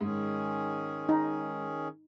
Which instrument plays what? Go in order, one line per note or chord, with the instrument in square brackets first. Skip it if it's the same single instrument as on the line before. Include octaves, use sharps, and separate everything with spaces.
[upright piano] G#2 [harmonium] D#3 C#4 G#4
[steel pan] D#4